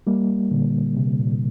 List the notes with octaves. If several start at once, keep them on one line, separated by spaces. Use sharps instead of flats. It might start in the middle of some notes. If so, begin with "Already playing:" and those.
G3 A#3
A#2 D3
C3
A#2